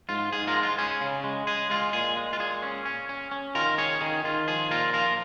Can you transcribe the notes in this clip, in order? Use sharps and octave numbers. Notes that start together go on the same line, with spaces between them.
G#2 F4
G#2 G#4
F4 A#4
G#3
F4
C#4 G#4
C#3
G#3
G#3 G#4
G#3 F4
A#2 G#4
G#3
F4
A#2 G#4
C#4
C#4
C#4
C#4
D#3 F4 A#4
C#4 G#4 C#5
D#3 G#4
D#3 F4
F3 G#4
A#2 F4 A#4
F3 F4 A#4